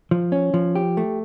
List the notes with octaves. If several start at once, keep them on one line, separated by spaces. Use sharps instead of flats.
F3
C#4
F3
G4
A3